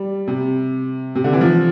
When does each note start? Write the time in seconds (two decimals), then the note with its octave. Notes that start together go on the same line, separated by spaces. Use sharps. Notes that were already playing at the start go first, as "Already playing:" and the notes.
Already playing: G3
0.28 C3
1.15 C3
1.24 D3
1.33 E3
1.41 F3